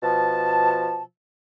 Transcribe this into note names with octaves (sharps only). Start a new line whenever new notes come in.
B2 F3 A5